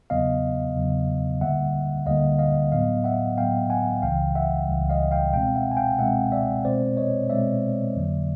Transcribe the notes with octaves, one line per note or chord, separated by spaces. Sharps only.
E2 C#3 F#3 B3 D#5 F5
E2 C#3 F#3 B3
D2 D3 G3 A#3 E5 F#5
D2 D3 G3 A#3 D#5 F5
D#5 F5
A2 F#3 B3 D#5 F5
E5 F#5
A2 F#3 B3 F5 G5
F#5 G#5
C#2 C#3 E3 G3 F5 G5
E5 F#5
C#2 C#3 E3 G3
D#5 F5
F5 G5
B2 G#3 C4 F5 G5
E5 F#5
G#5
F5 G5
B2 G#3 C4 E5 F#5
D5 E5
B2 G#3 C4 C5 D5
C#5 D#5
B2 G#3 C4 D5 E5
F2 D3 F#3 A#3